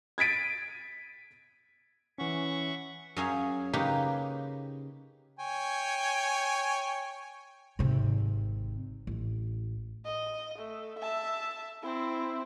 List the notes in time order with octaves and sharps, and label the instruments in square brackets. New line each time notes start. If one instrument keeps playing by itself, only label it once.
[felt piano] G#6 A6 B6 D7 D#7
[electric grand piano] E3 C#4 [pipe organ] E5 F#5 C#6
[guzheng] F#2 C#4 G#4 F5
C#3 A#3 D#4 G4 B4
[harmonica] C#5 G5 G#5
[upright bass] G#1 C3
A1
[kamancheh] D#5
A3
E5 A5
C4 E4